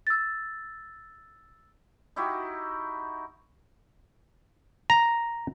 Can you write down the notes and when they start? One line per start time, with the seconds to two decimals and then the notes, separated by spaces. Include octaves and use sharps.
0.07 E6 A6
2.16 D#4 E4 F#4 G4
4.90 A#5